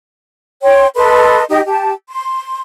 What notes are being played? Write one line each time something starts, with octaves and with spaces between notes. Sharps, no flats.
C#5 G5 C6
A4 B4 D#5 C6
D#4 G4 D#5
G4 A5
C6